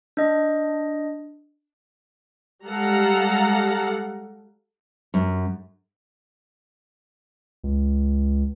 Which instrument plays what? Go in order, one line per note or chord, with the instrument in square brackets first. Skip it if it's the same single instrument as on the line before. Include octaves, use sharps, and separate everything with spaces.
[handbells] D4 D#5
[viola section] G3 G#3 A4 F5 F#5 A#5
[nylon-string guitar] F#2
[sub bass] C#2